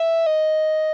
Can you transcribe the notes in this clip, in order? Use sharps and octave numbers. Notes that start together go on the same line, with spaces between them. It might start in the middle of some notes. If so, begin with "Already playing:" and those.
Already playing: E5
D#5